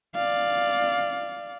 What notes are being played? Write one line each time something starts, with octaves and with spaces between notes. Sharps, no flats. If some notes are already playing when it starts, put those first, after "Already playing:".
D5 F5